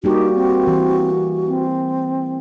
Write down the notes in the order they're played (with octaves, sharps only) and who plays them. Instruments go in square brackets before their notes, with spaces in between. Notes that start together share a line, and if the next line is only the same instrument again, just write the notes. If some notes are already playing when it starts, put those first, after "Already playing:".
[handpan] G3 A#3 G4 [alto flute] D#4 [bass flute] F#4
[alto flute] C4
[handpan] E3
[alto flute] C4